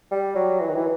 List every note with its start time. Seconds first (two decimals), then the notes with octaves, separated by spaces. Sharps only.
0.11 G3
0.36 F#3
0.60 E3
0.69 D#3
0.76 E3